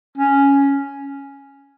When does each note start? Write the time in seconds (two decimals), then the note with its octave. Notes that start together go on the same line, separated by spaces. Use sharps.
0.18 C#4